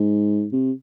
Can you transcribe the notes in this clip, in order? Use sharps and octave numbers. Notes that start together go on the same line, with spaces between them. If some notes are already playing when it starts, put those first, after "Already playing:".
Already playing: G#2
C3